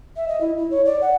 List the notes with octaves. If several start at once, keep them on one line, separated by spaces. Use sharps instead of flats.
E5
D#5
E4
E4
C#5
D5
F#5